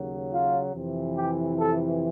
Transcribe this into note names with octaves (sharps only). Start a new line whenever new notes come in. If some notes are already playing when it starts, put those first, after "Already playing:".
Already playing: D#2 C#3 F#3
F4
F2 C3 E3
G4
A4